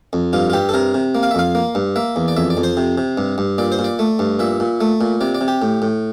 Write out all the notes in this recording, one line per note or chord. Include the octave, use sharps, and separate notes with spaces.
F2
G2 F4
F4
G2 G4
A4
C3 A#4
C3
A#3
F5
E5
F2 F5
A#3
G2
A#3 E5
E2
D5
F2 E5
D5
F2
C5
C3
C3
G2
G2
A#2 D5
C5
A#2
D5
A3
G2
A#2 E5
A#2
A3
A#2
C3 D5
D5
C3
G4
A2
A2